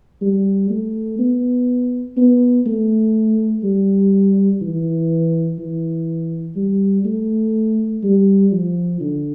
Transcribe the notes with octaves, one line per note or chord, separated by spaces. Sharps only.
G3
A3
B3
B3
A3
G3
E3
E3
G3
A3
G3
F3
D3